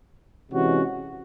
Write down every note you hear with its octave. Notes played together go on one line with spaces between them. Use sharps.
C3 E3 G#3 C#4 F#4